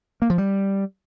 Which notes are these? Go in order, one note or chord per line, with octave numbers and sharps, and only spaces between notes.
A#3
F3
G3